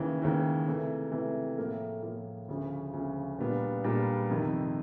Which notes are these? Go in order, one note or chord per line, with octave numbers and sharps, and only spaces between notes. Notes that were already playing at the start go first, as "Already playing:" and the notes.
Already playing: D#2 C#3 E3
D#2 C#3 E3
C3 E3 A3
C3 E3 A3
A2 F3 A#3
A2 F3 A#3
D2 C#3 F3
D2 C#3 F3
A#2 G3 B3 D4 F4
A#2 G3 B3 D4 F4
F2 C3 D#3